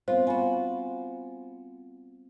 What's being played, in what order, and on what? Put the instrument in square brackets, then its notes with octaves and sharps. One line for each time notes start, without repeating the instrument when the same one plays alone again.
[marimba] G3 B3 C4 [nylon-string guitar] F4 [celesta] C5
[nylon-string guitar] F4 F#4 [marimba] G#5 B5